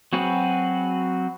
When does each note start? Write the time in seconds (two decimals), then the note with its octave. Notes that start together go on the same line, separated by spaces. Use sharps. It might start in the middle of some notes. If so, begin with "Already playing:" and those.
0.13 F#3 C4 F#4 G#4 B4